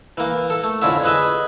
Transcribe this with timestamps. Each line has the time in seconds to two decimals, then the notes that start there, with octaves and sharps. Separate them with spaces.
0.17 E3 A#3
0.50 A4
0.64 A3
0.82 F2 D3 C#4 E4 F4 E5
1.04 G#4 B4 D#5 E5 G#5